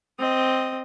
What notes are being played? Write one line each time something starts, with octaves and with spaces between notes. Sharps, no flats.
C4 D#5